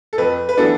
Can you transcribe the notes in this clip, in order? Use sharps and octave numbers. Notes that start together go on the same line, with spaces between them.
A4
F2 B4
B4
E3 B3 D4 A4